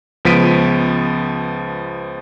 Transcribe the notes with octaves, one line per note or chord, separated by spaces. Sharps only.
C#2 F3 B3 B6 D7 D#7